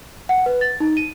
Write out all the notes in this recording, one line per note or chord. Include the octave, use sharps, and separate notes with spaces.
F#5
B4
A6
D#4
D#7